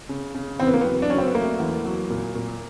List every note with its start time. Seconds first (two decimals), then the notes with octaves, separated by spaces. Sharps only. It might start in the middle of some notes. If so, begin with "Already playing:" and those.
0.09 C#3
0.35 C#3
0.60 E2 C4
0.67 B3
0.74 A#3
0.81 F#3 B3
1.02 D4
1.10 F#3 C#4
1.18 C4
1.27 B3
1.35 A3 A#3
1.60 E2
1.85 F#3
2.10 A#2
2.35 A#2